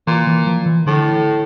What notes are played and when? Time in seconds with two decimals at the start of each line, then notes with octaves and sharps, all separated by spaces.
0.07 A#2 E3
0.27 E3
0.47 F3
0.66 E3
0.86 A2 D3